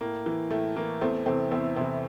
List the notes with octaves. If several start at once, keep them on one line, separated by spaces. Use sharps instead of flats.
A2 A#3
E3
A2 A3
E3 A#3
E2 A3 C4
C3 E3 A3 C4
E2 C4 E4
C3 E3 C4 E4